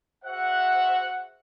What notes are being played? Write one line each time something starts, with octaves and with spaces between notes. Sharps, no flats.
F#4 G#4 C5 E5 F#5